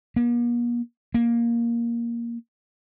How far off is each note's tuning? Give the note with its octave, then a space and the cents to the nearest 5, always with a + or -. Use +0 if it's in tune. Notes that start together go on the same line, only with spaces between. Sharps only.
A#3 +45
A#3 +10